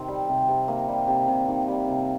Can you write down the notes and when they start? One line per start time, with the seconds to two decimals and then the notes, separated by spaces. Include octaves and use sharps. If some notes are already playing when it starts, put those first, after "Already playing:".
Already playing: C3 D#3 C4
0.08 G3
0.29 C3
0.49 C3
0.68 D#3 A#3
0.88 G3
1.08 C3
1.28 C3
1.48 D#3
1.68 G3
1.88 C3